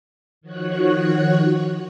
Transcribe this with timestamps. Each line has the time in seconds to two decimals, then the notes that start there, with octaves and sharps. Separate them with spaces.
0.41 D#3 F3 F#4 C#5 F#6